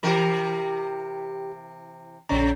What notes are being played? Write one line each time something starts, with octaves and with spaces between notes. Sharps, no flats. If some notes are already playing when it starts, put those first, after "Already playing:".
C3 E3 G4 A#4 G5 B5
A#1 C#3 C4 C#5 A#5